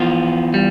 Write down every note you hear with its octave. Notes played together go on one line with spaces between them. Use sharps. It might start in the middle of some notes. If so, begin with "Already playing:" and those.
Already playing: E3 F3 B3 F4
G3